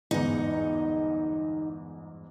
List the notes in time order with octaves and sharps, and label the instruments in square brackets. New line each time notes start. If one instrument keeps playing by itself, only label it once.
[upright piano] G1 E2 G#2 [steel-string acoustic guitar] D#4 F#5